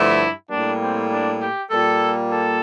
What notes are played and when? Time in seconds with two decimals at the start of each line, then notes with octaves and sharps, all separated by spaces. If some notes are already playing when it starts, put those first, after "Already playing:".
Already playing: G2 D3 F3 A3 E4
0.49 A2 G3 A#3 D4
0.80 C4
1.10 D4
1.41 G4
1.70 A#2 G3 A#3 A4
2.31 A4